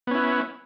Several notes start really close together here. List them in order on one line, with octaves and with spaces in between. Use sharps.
B3 C#4 E4